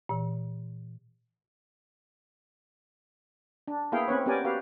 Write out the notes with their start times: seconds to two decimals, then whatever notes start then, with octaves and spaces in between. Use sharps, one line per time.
0.09 A#2 E3
3.68 D4
3.92 A#3 B3 E4 G#4 F5 G5
4.08 C4 C#4 B4 C#5
4.26 B3 C#4 G4 A#4 D5 G#5
4.45 F#4 G4 B4 F5